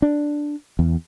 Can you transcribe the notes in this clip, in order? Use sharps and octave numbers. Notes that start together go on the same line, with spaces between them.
D4
E2